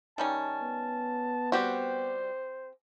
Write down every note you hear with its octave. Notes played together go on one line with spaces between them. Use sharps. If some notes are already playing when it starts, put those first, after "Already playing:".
D#3 G3 C#4 A5
B3
G3 C4 F#4 G4 C5